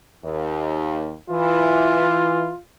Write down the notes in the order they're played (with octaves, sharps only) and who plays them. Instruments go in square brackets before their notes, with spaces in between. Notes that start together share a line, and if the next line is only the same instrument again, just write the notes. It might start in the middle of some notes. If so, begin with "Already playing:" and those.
[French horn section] D#2
[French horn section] E3 [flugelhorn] F4